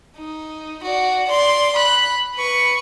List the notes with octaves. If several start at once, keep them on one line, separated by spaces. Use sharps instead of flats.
D#4
F#4 D5
D5 C6
B5 F#6
B4 C#6